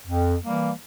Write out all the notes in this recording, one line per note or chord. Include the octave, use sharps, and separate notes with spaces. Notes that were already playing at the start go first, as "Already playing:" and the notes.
F2
E3 G3 A#3